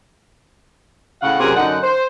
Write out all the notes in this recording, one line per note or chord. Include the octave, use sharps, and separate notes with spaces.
A2 C#3 F5 F#5
F#2 C3 C#4 F#4 G#4 A#4
F#2 D3 D#4 F#5
C5